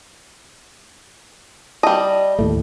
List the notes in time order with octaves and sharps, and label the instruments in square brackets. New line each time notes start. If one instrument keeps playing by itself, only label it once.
[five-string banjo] G3 D#5 [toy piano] A5
[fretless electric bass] D#2 A2 A3